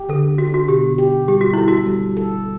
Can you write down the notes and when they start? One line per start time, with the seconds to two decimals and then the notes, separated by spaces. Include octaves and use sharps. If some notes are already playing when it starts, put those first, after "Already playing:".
Already playing: G4
0.09 D3 A4
0.38 D4 F#4
0.54 F#4
0.68 B2 G4
0.98 G4
1.28 G3 G4
1.41 F#4
1.53 E4 A4
1.68 F#4
1.86 G3
2.17 A4